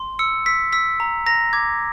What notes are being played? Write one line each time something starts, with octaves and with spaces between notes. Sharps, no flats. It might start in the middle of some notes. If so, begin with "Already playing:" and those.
Already playing: C6
E6 C#7
E6 B6
E6 B6
A#5
A#5 A#6
D6 G#6